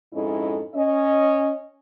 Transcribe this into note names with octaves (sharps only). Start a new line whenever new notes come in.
F2 G#2 C#4 E4 A4 D#5
C#4 D#5